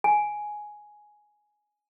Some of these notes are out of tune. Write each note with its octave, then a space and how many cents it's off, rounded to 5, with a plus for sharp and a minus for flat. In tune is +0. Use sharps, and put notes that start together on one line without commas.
G#5 +10